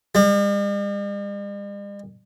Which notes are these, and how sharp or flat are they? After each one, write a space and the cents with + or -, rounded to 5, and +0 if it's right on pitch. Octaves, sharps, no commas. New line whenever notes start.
G3 +45